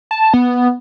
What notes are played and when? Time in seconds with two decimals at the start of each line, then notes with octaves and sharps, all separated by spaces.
0.11 A5
0.34 B3